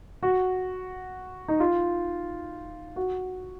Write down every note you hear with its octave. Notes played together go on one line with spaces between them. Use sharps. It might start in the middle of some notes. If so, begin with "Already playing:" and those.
F#4
D#4
F4
F#4